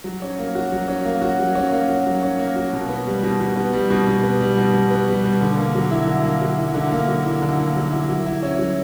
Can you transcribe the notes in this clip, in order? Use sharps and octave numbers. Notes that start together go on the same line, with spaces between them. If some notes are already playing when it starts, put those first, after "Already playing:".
F#3
C#4
A#3
F#4
F#3
C#4
A#3
F#4
F#3
C#4
A#3
F#4
F#3
C#4
A#3
F#4
B2
B3
G3
B2
B2
B3
G3
B2
B2
B3
G3
B2
B2
B3
G3
B2
D3
A#3
F#3
E4
D3
A#3
F#3
E4
D3
A#3
F#3
E4
D3
A#3
F#3
E4
F#3
E4
C#4
F#3